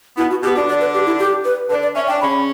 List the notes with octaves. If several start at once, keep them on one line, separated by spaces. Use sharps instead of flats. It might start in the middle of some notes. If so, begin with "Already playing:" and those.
B2 B3 E4
F#4
B2 B3 G4
D3 D4 F#4
D5
B4
G4
E4
G4
B4
D3 D4 B4
D5
C#4 E5
D4 G5
C#3 C#4 B5